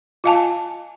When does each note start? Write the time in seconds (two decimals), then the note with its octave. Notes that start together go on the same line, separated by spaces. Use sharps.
0.24 F4 D#5 F5 G#5 A5